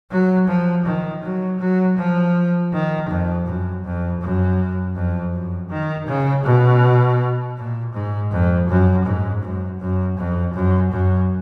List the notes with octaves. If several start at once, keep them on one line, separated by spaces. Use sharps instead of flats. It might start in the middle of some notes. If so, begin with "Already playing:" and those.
F#3
F3
D#3
F#3
F#3
F3
D#3
F2
F#2
F2
F#2
F2
F#2
D#3
C#3
B2
A#2
G#2
F2
F#2
G#2
F#2
F#2
F2
F#2
F#2